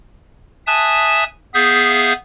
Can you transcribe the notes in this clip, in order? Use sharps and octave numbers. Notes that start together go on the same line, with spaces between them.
E5 G#5 A5 D#6 F#6
B3 G#4 E5 F5 D#6 G6